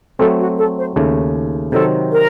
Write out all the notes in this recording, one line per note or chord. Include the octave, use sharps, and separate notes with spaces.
F#3 A3 C4 A4
F#4
A4
C5
D#2 C#3 A3
C3 D#3 F#3 C4 A4
A#4